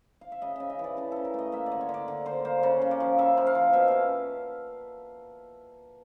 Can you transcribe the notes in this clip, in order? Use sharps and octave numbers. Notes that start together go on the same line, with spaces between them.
F5
E5
C#3 D#5
C#3 E5
D#5
E3
D5
C#3 A4
C#3 A4
A#4
A3 D#5
A#3 E5
D5
D3
C#5
D3
D5
D3
D3 C5
A#3 C5
C#3 C#5
C#3
D5
F3
C#3 E5
F3
F5
F3
B2 E5
C#4 F5